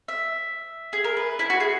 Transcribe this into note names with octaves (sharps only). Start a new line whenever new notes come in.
E5
G#4
A#4
B4
E4
F#4
G#4